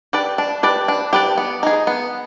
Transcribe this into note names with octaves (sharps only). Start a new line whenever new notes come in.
G4 B4 D5
D4
G4 B4 D5
D4
G4 B4 D5
B3
D#4 G#4
B3